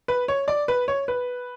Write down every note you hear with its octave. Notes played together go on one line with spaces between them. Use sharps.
B4
C#5
D5
B4
C#5
B4